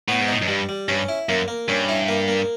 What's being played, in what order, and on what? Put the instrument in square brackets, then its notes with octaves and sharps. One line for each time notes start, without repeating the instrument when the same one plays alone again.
[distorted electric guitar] A2 [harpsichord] B3
[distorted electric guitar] G#2
[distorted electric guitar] A2 [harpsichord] D#4
[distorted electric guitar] F#2
[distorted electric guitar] G2 [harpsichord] G3
[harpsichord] G3
[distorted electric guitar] G2 [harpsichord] C#4
[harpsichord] E4
[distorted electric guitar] F#2 [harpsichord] A#3
[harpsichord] A#3
[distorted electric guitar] G2 [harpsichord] C#4
[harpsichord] E4
A#3
A#3